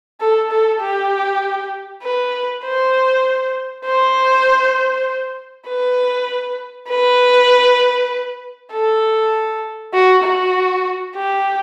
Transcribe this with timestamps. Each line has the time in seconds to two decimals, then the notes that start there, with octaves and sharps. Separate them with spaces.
0.20 A4
0.51 A4
0.81 G4
2.03 B4
2.64 C5
3.85 C5
5.68 B4
6.89 B4
8.72 A4
9.94 F#4
10.24 F#4
11.15 G4